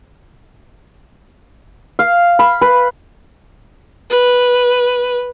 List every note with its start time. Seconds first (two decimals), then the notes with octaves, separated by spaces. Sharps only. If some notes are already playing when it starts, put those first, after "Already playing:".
1.99 F5
2.39 B5
2.61 B4
4.10 B4